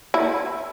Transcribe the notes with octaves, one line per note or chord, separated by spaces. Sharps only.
E4